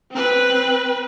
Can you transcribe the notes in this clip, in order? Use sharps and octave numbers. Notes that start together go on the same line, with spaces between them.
C4 B4